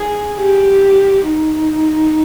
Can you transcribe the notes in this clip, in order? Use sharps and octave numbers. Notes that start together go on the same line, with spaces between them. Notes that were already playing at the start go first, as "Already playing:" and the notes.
Already playing: G#4
G4
D#4